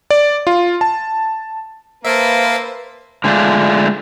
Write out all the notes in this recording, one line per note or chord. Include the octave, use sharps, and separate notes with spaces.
D5
F4
A5
A#3 B4 C5 E5 F5 A5
D3 G#3 A3 D4 F4